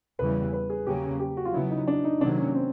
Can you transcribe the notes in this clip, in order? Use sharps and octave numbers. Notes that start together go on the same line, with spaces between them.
E2 C#3 E3 G3 B4
B4
G#4
E2 C#3 F#3 A#3 C#4 G4
G4
F#4
F4
C#3 F#3 B3 E4
D#4
D4
D#4
C3 D#3 F#3 A#3 D4
C#4
C4